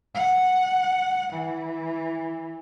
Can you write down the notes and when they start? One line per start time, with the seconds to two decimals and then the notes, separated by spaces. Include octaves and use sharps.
0.15 F#5
1.33 E3